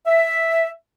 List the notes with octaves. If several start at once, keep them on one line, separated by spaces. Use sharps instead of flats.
E5